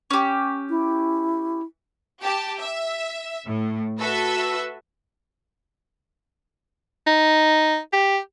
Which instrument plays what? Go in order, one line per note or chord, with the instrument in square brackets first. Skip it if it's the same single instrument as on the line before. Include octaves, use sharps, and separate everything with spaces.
[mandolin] C#4 G4
[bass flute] E4
[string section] G4 A5
E5
A2
F#4 A4 B4 E5 E6
[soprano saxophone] D#4
G4